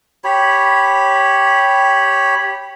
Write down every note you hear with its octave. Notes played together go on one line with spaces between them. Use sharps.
G4 C#5 B5